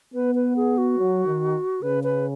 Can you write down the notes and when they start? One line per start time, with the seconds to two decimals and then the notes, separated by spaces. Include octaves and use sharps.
0.14 B3 B4
0.35 B4
0.56 G#4
0.78 F#4
0.99 F#3
1.26 D#3
1.82 C#3 B4
2.04 B4